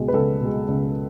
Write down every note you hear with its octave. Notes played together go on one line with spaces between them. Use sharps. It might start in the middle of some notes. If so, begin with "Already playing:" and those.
Already playing: C#2 B2 G#3
B4
C#2 A4
B2 G#3
C#2